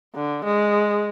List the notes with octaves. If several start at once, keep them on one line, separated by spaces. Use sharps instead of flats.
D3
G#3